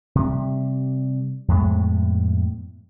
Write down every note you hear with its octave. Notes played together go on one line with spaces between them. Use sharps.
C3 G3
F2 A2 G#3 B3